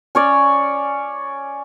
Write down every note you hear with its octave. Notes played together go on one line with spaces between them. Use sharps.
C#4 C#5 D5